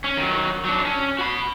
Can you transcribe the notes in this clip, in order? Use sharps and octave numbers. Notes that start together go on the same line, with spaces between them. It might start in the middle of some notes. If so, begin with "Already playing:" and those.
C#4
D#3 F#3
F#3 D4
C#4
F#4 B5